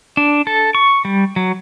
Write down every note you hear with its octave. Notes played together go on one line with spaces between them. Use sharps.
D4
A4
C#6
G3
F#3